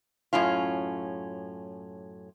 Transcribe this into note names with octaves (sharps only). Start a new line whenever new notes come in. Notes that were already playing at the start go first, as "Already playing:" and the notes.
F#2 A2 C#4 F4